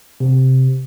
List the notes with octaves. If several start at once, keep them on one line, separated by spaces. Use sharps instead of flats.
C3